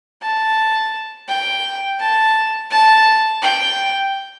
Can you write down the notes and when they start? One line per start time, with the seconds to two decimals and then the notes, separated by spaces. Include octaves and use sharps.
0.22 A5
1.28 G5
2.00 A5
2.71 A5
3.42 G5